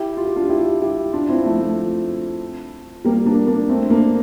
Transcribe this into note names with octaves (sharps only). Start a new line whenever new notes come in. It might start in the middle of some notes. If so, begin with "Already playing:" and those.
Already playing: E4 G4
F4
G4
D4 F4
E4 G4
E4 G4
D4 F4
C4 E4
F3 A3
F3 A3
G3 A#3
A#3 D4
A#3 D4
A3 C4
A#3 D4